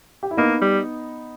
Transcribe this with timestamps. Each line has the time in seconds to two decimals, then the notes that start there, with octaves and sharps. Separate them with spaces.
0.23 G4
0.31 E4
0.37 A#3 B3 D#4
0.62 G3